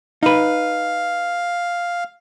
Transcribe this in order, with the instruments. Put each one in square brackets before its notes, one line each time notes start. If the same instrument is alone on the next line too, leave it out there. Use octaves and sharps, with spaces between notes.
[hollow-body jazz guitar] D#4 B4 [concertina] F5